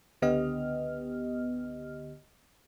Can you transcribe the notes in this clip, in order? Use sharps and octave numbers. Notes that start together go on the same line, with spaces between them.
C#2 D3 B3 G4 D#5 F6